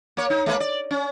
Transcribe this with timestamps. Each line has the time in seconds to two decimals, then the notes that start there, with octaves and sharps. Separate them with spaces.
0.17 A#3 C#5
0.30 D#4
0.46 G#3 A#3 B4
0.60 D5
0.91 C#4